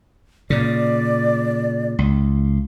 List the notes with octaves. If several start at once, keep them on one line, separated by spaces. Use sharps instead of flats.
A#2 C#3 D5
C#2